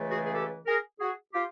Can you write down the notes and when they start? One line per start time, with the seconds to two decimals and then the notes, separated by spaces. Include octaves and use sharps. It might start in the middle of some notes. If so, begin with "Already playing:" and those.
Already playing: C#2 C#3 E3 A3
0.11 F#4 G#4
0.25 G#4
0.34 G4 A4
0.67 G#4 A#4
1.00 F#4 G#4
1.33 F4 G4